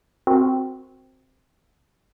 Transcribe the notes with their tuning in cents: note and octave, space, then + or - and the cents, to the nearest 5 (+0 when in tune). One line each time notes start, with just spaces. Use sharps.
C4 +0 F#4 +0 A#4 +0